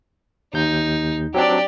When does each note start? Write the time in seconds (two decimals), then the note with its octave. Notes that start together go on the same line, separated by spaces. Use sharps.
0.54 D#2 D#4 G6
1.34 F#3 C4 D4 G4 D5